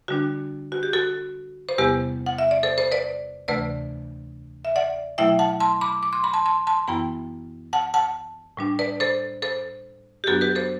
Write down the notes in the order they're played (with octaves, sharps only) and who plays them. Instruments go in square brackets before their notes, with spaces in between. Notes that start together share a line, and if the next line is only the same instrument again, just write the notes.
[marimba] D3 G3 D4 F#4
F#4
G4
F#4 A4
C5
E2 C3 G3 B3 G4 B4
F#5
E5
D5
A4 C5
A4 C5
B4 D5
D2 C3 E3 A3 B4 D5
E5
D5 F#5
B2 F#3 A3 E4 E5 G5
F#5 A5
A5 C6
B5 D6
D6
C6
B5
A5 C6
A5 C6
A5 C6
F#2 E3 B3 E4 G5 B5
F#5 A5
F#5 A5
A2 G3 D4
B4 D5
A4 C5
A4 C5
G4
F#2 F#3 B3 D4 F#4 A4
G4 B4
A4 C5